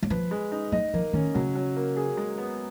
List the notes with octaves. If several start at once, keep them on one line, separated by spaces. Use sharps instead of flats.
F#3
F3 B4
G#3
D#4
F#3 D#5
F3 A#3
D#3 C#4
C#3 F#3
F#3
A#3
G#4
G#3
B3